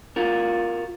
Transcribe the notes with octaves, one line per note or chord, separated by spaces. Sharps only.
F4 F#4 A#4